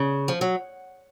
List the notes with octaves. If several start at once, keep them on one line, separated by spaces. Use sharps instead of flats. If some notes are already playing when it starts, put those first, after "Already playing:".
Already playing: C#3
F3
F#3